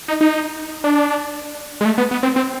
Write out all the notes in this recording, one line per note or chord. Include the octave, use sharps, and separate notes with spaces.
D#4
D#4
D4
G#3
A3
B3
B3
C4
C4